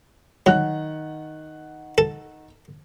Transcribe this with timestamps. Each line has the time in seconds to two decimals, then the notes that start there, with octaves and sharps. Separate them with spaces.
0.46 D#3 F#3 F#5 F#6
1.98 A4